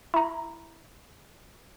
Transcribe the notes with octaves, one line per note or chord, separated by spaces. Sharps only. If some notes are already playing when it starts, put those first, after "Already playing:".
E4 A#5